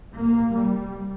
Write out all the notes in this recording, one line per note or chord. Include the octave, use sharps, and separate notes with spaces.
C2 A#2 A#3
G3